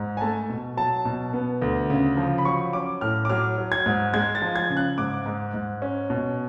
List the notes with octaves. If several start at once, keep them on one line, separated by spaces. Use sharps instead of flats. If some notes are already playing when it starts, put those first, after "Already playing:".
Already playing: G#2
G#5
A3 A5
B2
F#3 A5
B2
B3
D2
C#3
F3
B5
F#3 C#6
C#4 D6
A2 F6
D6
F#3 F6
F#3
G#6
G#2
G#3 G#6
A6
F3
G#6
C#3
F#6
G#2 D6
G#2
G#2
C#4
B2